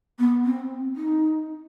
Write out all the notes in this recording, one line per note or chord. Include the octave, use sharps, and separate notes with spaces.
B3
C4
D#4